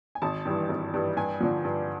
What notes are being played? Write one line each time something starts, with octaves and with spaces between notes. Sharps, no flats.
G#5
G#1 A5
G2 E3 G3
G#1
G2 E3 G3
G2 G#5
D3 F3
G2